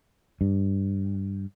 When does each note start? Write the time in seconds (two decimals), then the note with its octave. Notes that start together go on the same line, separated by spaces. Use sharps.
0.41 G2